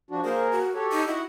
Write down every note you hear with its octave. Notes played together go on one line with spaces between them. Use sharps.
F3 D4 F#4
A#3 G#4 A#4 C5
F#4
G4 A4 C#5
D#4
E4 F#4 D#5 F#5